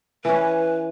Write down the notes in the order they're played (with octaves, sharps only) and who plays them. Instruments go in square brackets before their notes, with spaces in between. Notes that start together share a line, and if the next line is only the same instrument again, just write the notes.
[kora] E3 C#4 [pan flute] B4